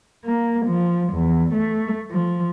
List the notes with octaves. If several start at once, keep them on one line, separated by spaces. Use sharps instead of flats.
A#3
F3
E2
A3
F3